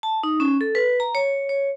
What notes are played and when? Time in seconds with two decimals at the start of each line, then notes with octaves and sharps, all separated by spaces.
0.03 A5
0.23 D#4
0.40 C#4
0.61 A4
0.75 B4
1.00 A#5
1.15 C#5
1.49 C#5